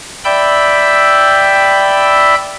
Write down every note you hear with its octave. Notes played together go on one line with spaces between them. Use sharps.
D5 E5 G5 B5 E6 G6